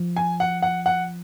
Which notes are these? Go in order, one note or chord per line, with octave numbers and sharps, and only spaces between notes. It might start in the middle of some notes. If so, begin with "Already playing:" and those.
Already playing: F3
G#5
F#5
F#5
F#5